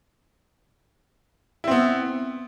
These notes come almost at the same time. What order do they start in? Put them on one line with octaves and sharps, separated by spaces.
E4 C4 B3